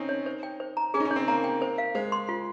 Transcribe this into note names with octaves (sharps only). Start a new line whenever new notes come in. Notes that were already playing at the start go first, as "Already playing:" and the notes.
Already playing: C4 C#4 D#4
C#5
C5
G5
C5
A#5
C#4 G#4
D#4
C#4
C#5
C4
A#3 A#5
G5
C5
F5
G#3 C5
C6
F4